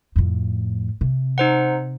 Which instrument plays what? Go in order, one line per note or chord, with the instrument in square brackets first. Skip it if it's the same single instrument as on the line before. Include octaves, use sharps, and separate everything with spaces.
[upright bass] F2 A2
C3
[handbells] D#4 C5 F#5